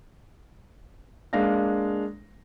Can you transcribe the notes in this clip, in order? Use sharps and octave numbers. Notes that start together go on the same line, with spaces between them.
G#3 A#3 D4 F5 A#6